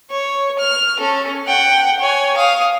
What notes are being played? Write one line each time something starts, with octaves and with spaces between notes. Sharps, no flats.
C#5
F6
C#4 A4
F#5 G5
C#5 G#5
F5 D#6